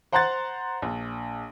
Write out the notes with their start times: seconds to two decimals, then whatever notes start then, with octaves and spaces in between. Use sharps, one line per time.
0.12 C5 F#5 A#5 C6 F#6 A6
0.82 A#1